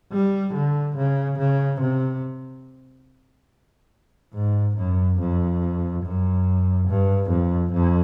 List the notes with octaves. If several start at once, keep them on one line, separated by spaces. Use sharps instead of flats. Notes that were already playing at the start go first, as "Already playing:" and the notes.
G3
D3
C#3
C#3
C3
G#2
F#2
F2
F#2
G2
F2
F2